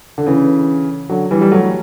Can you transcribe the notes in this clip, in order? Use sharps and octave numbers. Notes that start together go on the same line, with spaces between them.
D3
C#3 E3
D3 F#3
E3 G3
G3
F#3 A3